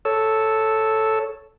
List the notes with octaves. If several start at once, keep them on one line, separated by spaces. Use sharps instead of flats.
A4 C#5 E6